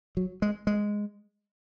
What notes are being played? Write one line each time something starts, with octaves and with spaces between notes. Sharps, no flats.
F#3
G#3
G#3